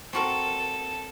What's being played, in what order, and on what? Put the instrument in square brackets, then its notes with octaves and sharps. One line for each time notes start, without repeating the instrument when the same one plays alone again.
[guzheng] C4 F#4 A#4 [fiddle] A4